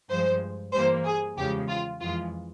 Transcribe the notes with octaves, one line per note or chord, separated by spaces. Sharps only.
G2 F3 G#3 C5
G2 E3 G3 A#3 C5
G#4
E2 C#3 F3 G#3 G4
F4
F2 E3 G#3 F4